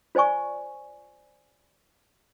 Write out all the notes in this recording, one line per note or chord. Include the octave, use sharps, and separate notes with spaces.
F4 C5 D5 G#5 C#6